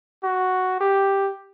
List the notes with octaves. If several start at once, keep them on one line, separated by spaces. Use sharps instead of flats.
F#4
G4